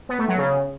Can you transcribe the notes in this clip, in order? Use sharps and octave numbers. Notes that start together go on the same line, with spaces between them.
B3
A3
F#3
C#3